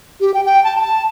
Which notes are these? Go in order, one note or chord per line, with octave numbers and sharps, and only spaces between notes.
G4
G5
G5
A5
A5